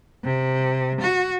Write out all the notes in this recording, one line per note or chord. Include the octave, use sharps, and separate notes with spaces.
C3
F#4